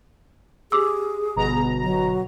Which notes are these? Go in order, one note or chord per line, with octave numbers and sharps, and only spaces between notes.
G4 G#4 D6 E6
G1 B2 A#5
F#3